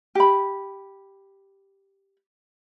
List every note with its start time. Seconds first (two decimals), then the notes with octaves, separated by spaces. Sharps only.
0.15 G4 B5